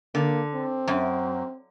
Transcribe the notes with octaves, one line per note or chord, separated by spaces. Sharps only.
D3 A#3
C4
F#2